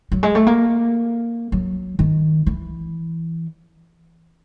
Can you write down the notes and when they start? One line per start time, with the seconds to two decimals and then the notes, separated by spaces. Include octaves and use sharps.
0.12 F#3
0.23 G#3
0.35 A3
0.47 A#3
1.52 F#3
1.99 D#3
2.46 E3